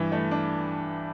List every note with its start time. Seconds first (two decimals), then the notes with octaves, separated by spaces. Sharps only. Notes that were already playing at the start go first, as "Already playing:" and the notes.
Already playing: G2 E3
0.12 A3
0.31 D4